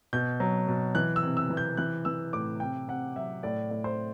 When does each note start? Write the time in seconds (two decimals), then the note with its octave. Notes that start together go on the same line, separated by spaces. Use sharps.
0.13 B2 G6
0.40 F#3
0.68 B2
0.95 E3 F#6
1.16 E6
1.23 C3
1.37 E6
1.50 E3
1.57 G6
1.77 E3 F#6
2.05 E3 E6
2.33 A2 D6
2.60 C3 G5
2.88 C3 F#5
3.16 F#3 E5
3.43 A2 D5
3.71 A2
3.84 C5